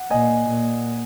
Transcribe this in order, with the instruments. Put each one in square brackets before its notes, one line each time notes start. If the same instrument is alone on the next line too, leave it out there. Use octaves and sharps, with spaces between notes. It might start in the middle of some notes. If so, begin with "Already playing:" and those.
Already playing: [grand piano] F#5
[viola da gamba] A#2 [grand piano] D#5 G#5
[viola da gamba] A#2